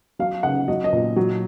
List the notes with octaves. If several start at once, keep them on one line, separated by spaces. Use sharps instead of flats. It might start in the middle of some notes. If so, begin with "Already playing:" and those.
F#3 F5
C#3 F#5
F#3 D#5
D#5
A#2
F#3